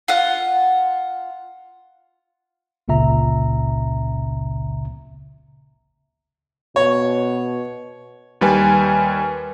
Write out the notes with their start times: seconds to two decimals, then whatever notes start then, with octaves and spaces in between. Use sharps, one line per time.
0.08 F4 F#5
2.88 G1 C#2 A#2 C#3 E5 A#5
6.76 B2 C#5
8.41 D#2 G3 B4 G#5